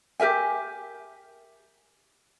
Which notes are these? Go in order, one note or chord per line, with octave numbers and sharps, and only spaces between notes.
G4 A#4 E5 G#5